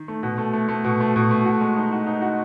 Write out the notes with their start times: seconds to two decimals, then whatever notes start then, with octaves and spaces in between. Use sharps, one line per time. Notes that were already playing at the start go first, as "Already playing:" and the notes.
Already playing: D#3
0.08 A3
0.23 B2
0.38 A3
0.53 A3
0.69 A3
0.84 B2
1.00 A3
1.16 B2
1.31 A3
1.45 F#4
1.61 G#3
1.76 D#4
1.92 F#4
2.07 D#4
2.22 F#4